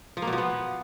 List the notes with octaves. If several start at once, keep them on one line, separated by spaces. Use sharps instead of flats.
F3
A#3
B2
F3
B3